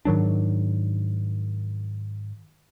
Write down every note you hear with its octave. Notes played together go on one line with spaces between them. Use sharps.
G#2 D#3 F#3 D4